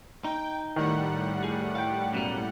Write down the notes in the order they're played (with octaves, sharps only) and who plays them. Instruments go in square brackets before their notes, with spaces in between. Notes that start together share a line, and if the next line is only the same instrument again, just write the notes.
[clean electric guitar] D#4 [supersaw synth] G5
[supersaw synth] A2 G3 F#5 [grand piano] D#3
[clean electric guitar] G#4
F5 G5
F#2 B2 A#3